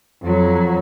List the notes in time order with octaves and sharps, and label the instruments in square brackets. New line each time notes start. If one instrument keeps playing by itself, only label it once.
[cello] F2 F#3